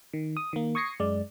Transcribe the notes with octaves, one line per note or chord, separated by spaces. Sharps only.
D#3
D#6
D#3 A#3
C#6 D#6 G#6 A#6 C7 C#7
F#2 G#3 D5